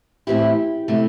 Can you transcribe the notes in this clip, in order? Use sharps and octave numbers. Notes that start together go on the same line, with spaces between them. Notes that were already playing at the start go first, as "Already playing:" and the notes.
A2 E3 C4 E4 G4
C3 A3 E4 G4